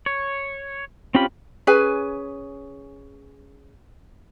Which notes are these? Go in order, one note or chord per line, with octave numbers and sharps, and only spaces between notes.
C#5
C4 C#4 F4 G4 B5
C#4 G#4 B4 G#5